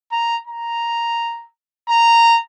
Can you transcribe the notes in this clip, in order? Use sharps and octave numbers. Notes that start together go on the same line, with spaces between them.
A#5
A#5
A#5